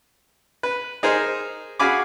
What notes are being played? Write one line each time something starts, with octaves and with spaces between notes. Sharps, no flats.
B4
D#4 G#4 A#4 C5
F#4 G#4 F5 G#5 B5 D6